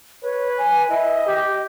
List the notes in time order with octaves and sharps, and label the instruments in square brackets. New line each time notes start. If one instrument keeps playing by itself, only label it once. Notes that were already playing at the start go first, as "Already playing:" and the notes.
[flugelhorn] B4 [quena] C#5
[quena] G#5
[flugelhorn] E4 [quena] D#5
[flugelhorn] G4